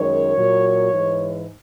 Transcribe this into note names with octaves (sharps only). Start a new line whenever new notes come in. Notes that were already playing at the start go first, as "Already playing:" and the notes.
Already playing: F#2 D#3 G#3 C#5
A#2 F#3
G#2 E3 G#3